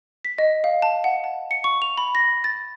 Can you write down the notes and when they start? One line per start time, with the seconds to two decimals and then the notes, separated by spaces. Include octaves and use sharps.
0.25 B6
0.38 D#5
0.64 F5
0.82 A5
1.04 F#5
1.24 A5
1.51 C#7
1.64 C#6
1.82 F7
1.98 B5
2.15 A#6
2.44 A6